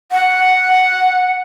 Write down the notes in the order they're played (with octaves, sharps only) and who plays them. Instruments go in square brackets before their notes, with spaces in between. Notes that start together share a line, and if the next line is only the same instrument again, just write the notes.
[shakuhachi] F#5